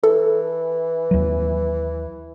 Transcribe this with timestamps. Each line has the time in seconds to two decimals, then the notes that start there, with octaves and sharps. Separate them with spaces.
0.04 E3 A4
1.11 D#2 F#3